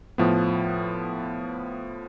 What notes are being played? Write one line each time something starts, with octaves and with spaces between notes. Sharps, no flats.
A2 F3 B3